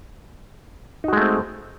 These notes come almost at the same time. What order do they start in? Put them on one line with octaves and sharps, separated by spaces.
D#4 F#4 G#3 A3 C4